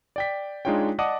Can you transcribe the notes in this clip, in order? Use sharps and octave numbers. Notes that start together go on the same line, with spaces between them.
D5 G5 B6
G#3 D4 D#4 F4 C#5 G5
D5 D#5 F#5 A5 D6 D#6